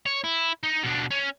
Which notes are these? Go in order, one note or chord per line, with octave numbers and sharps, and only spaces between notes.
C#5
E4
D#4
B2 D4
C#4